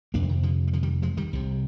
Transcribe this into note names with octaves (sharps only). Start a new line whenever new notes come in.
F2 C3 A#3 D4
D3
D#3
D3 F3
G3
D3 F3
D#3 G3
F3 G#3
D#3 G3
C2 C3